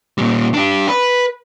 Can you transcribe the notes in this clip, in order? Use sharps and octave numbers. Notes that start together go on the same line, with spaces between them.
A#2 G3
D4 G4
B4